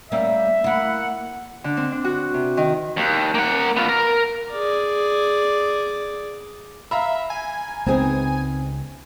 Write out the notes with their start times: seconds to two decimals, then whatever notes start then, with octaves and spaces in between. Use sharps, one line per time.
0.12 G3 A#3 C#4 E5
0.64 A#3 E4 F#5
1.64 D3
1.77 C4
1.92 D4
2.04 F#4
2.34 C3
2.57 D#3
2.97 D#2
3.35 A#3 F#5
3.77 B3 F4
3.89 A#4
4.52 G#4 D5
6.91 E5 F5 A#5 B5
7.30 G#5
7.86 C#2 G#3 B3 C4 D#4 G#4